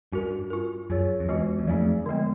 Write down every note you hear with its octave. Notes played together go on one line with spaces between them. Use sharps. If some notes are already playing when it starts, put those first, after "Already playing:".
G2 C#4 F#4 A#4
C#4 F4 A#4
F#2 C#4 F4 G#4 C#5
F2
E2 E3 G#3 C#4 F#4
E2
F2 F#3 A3 C4 D#4 G#4
D3 F3 G#3 B3